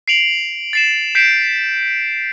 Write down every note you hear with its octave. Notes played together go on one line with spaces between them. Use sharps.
C7 D7 F7 F#7
A6 C7 E7
G6 B6 C7 D7 E7